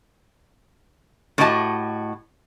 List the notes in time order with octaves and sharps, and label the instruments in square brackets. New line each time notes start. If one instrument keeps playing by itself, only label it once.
[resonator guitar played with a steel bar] A2 D4 F#4 G4 D#5 A5